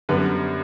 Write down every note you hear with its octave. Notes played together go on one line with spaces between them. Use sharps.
F#2 D3 G3 B3 B4